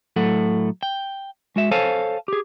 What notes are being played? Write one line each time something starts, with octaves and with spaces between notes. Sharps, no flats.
A2 F#3 A3 A4 F#5
G5
G#3 F#4 E5
A4 C5 C#5 F5 G#5 A5
G4 G#4